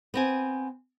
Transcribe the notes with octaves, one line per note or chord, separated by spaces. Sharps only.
B3 C4 G#5